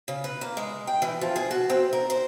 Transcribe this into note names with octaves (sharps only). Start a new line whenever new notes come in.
C#3
B4
A#3
G#3
G5
E3
F3
G#4
F#4
C4
A#4
C5